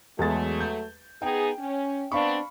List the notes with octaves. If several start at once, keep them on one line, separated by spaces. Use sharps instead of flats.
E2 F#3 G#3 A3 A6
G6
B3 D#4 G#4 G5
C#4
B3 C4 D4 F5 B5 C#6